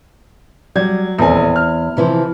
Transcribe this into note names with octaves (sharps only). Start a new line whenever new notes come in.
F#3 G3 D5 G#6
D#1 E2 C4 G#5
F6
C3 E3 F3